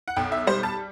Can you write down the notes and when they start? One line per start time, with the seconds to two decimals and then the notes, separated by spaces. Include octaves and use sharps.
0.08 F#5
0.16 B1 G5
0.32 E5
0.47 G3 C5
0.63 A5